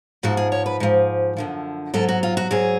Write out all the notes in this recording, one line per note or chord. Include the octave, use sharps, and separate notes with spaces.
G#2 F3 F#4
G#4
C#5
B4
G#2 F3
F#2 D3 F3
G#2 F#3 A4
F#4
F4
F#4
G#2 F#3 G#4